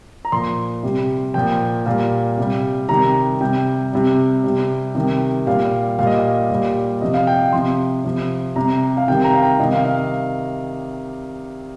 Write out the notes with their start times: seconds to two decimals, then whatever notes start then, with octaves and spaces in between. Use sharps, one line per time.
0.25 A#5
0.32 A#2 F3 C6
0.83 C3 G3
1.34 A#2 F3 G5
1.86 A#2 G3 F5
2.38 C3 G3
2.89 C3 D#3 G3 A#5
3.41 C3 G3 G5
3.93 C3 G3
4.44 C3 G3
4.95 C3 D#3 G3
5.46 A#2 G3 F5
5.99 A#2 G3 F5
6.07 D#5
6.14 F5
6.51 A#2 G3
7.01 C3 F3 D#5
7.14 F5
7.27 G5
7.53 C3 F3 C6
8.05 C3 F3
8.56 C3 G3 A#5
8.97 F5
9.08 C3 D#3 G3 G5
9.24 A#5
9.34 F5
9.42 G5
9.60 C3 D#3 G3 D#5
9.73 F5
9.85 F5